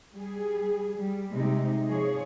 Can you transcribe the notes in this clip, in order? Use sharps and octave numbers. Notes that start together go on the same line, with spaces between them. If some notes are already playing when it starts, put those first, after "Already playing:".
G3 G#4
G3
C3 G#3 D#4
F3 G#4 C#5